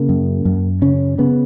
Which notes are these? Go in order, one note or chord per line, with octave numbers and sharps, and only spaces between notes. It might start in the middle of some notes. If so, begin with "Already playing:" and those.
Already playing: C#3 A#3
F#2
F#2
C#3 C#4
C#3 B3